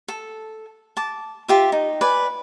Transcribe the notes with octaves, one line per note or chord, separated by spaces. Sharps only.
A4
A5 D6
F4 G4 E5
D#4
B4 D5 G#5